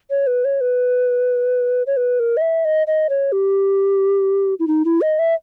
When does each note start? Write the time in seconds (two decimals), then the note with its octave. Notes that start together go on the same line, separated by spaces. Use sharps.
0.10 C#5
0.27 B4
0.45 C#5
0.61 B4
1.87 C#5
1.97 B4
2.20 A#4
2.37 D#5
2.41 E5
2.65 D#5
2.87 D#5
3.09 C#5
3.32 G4
4.59 E4
4.67 D#4
4.85 E4
5.01 D#5
5.19 E5